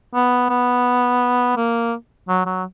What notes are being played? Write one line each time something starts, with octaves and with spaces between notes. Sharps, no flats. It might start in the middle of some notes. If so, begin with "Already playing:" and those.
B3
B3
A#3
F#3
F#3